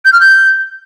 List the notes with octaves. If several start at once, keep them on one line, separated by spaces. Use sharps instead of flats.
G6
F6
G6